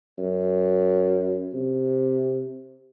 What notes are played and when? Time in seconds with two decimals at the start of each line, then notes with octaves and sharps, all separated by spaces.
0.18 F#2
1.53 C3